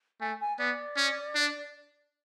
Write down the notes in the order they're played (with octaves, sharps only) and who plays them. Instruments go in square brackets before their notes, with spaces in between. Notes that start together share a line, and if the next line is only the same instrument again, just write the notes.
[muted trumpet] A3 [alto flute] G#5
[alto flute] G#5
[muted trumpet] B3 [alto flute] D5
[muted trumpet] C#4
D4